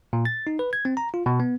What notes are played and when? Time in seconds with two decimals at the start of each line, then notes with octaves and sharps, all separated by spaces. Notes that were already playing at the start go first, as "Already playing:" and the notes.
0.13 A#2
0.25 A6
0.47 D#4
0.59 B4
0.73 G#6
0.85 C4
0.97 A#5
1.14 F4
1.26 B2
1.40 B3